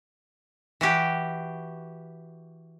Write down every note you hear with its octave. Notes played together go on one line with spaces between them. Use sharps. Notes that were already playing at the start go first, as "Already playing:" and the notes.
E3 F#4 G4